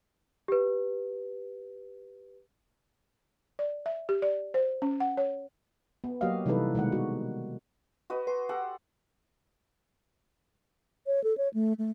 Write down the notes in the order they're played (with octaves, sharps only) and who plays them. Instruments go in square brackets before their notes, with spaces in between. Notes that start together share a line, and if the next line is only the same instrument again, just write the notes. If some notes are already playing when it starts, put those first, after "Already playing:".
[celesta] G4 B4
[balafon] D5
E5
G4
D5
C5
C#4
F#5
C#5
[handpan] B3
F#3 A#3 F#4 G4 D#5 F5
C3 E3 G3 D#4 A4 B4
B2 D#3 G#3 F#5
F#4
[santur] F#4 B4 D#5
[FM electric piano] B4 [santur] C6
[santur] G4 A4 F#5
[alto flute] C#5
A4
C#5
A3
A3